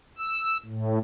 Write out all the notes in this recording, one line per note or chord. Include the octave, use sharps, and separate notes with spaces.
E6
A2